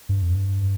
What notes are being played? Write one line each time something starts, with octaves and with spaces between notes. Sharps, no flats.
G2
F2
G2